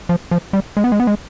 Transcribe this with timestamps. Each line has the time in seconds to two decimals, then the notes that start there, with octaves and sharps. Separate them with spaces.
0.09 F3
0.31 F3
0.53 G3
0.77 G#3
0.84 B3
0.92 G#3
1.00 B3
1.07 G#3